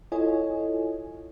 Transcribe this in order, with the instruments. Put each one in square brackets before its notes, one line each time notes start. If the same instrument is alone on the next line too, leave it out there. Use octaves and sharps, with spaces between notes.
[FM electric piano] E4 F4 A4 C#5 D#5 G#5